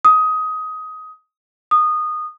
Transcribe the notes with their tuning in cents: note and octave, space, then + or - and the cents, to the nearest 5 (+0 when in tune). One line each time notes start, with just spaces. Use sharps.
D#6 +15
D#6 -20